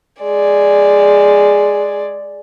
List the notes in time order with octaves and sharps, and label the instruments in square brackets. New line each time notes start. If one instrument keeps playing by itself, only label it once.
[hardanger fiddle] G#3 D5